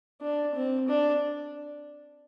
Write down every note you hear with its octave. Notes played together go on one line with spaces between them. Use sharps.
D4
C4
D4